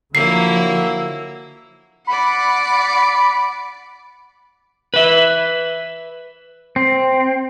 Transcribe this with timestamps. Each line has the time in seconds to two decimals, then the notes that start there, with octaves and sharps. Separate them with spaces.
0.15 D3 F3 F#3 A#3 E4 E6 C7
2.07 D5 F#5 B5
4.94 B4 E5
6.76 C4